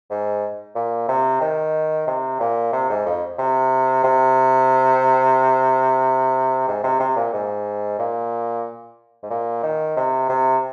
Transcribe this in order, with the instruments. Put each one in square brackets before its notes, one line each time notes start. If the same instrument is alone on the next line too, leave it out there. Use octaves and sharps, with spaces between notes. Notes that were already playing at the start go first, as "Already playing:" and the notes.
[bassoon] G#2
A#2
C3
D#3
C3
A#2
C3
G#2
F2
C3
C3
G#2
C3
C3
A#2
G#2
A#2
G#2
A#2
D#3
C3
C3